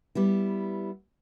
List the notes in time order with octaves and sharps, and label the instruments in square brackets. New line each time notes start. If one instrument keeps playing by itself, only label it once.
[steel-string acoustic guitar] G3 B3 E4